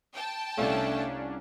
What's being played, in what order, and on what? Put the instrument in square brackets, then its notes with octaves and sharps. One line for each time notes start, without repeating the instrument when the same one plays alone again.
[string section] G5 A5
[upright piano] C2 C#5 F5 [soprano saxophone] A3 [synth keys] C#4 D4